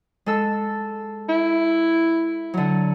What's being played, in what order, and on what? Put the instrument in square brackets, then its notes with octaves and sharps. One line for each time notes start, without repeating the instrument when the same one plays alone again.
[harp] G#3 A4 E6
[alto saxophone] E4
[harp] D3 F#3